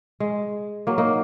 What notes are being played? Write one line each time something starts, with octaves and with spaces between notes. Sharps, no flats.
G#3
F#3 A#3
A#3 D#4